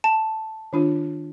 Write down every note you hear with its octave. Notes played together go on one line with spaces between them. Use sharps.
A5
D#3 D4 F4